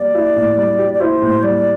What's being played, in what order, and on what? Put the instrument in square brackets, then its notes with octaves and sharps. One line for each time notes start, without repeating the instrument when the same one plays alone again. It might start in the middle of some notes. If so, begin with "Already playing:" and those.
Already playing: [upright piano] G3 G4 [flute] D5
[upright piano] E4
A2
G3
G4
[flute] D5
[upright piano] E4 [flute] C5
[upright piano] A2
[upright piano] G3 [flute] D5